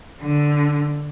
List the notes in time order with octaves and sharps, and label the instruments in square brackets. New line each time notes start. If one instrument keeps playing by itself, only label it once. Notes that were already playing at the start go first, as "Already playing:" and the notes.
[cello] D3